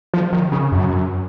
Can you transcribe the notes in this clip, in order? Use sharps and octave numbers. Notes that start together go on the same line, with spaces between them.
F3
D#3
C#3
F#2